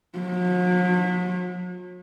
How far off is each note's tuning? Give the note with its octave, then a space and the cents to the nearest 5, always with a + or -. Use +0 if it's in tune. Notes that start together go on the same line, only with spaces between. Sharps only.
F#3 -45